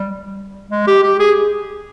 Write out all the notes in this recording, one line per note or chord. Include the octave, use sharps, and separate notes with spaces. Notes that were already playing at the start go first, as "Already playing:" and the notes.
Already playing: G3
G#3
G4
G4
G#4